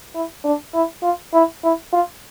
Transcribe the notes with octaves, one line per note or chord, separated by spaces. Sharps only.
E4
D4
E4
F4
E4
E4
F4